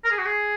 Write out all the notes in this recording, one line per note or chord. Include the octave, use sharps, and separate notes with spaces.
A#4
G#4
F#4
G#4